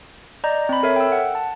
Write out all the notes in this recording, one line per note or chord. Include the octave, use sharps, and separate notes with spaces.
D5 D#5 A#5 G6
C4 B5
A4 A#4 C#5 E5
G5 E6
F#5
A5